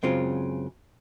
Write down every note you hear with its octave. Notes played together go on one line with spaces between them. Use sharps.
F#2 C#3 G#3 C4 F4